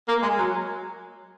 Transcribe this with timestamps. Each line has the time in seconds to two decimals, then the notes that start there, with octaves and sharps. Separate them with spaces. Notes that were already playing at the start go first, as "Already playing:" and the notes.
0.08 A#3
0.22 G#3
0.38 F#3